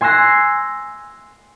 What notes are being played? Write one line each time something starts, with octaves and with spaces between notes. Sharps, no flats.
G#5 C6 E6 F#6 A#6 C7